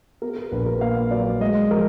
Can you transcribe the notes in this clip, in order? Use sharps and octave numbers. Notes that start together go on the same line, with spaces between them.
B3 A#4
A#4
A#1 B4
A#4
A#2 F5
F#3 D5
G#3 D#5
F3 A#4